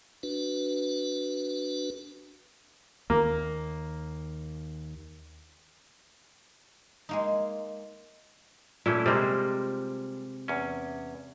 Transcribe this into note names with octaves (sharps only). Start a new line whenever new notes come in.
D4 F#4 B4
D#2 A#3
G#3 A#3 D#4
A#2 E3 A3 C#4 E4
C3 G3 G#3 A#3 C5
E2 C#4